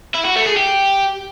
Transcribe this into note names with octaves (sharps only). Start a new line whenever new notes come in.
E4
F#4
A3
G#4
G4